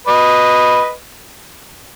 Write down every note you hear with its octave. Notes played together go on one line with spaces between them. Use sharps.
B4 D#5